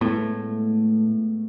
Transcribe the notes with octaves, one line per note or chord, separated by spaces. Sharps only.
A2 G#3 A3 B3